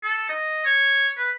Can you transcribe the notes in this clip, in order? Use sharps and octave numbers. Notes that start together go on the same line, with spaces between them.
A4
D#5
C#5
B4